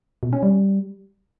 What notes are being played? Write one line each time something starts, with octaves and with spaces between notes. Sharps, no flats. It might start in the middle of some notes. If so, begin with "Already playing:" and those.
B2
C#4
G3